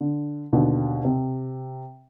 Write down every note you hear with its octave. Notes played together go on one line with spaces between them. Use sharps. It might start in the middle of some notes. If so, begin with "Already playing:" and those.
D3
D#2 B2 D3
C3